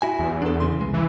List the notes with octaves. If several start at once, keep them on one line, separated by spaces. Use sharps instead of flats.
E4 F#4 G#5
E2
D4 A4
C#3 E3 C6
C2 G#3
E3